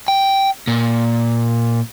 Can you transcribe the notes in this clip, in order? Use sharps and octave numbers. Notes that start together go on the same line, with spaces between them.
G5
A#2